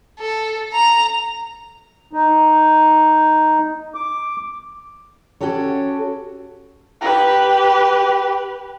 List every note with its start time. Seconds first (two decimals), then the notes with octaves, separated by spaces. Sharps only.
0.19 A4
0.73 A#5 F7
2.13 D#4
3.95 D6
5.41 C#4 F#4 G4 A4 C#5
7.01 G4 B4